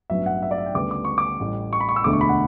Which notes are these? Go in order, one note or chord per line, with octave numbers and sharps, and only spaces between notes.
A1 G2 F#3 B3 E5
F#5
E5
D5
E5
G5
D2 C#3 G3 B3 D6
D6
C#6
D6
A1 A2 G3
C#6
B5
C#6
E6
E1 D2 D3 A3 D6
C#6
B5
F#5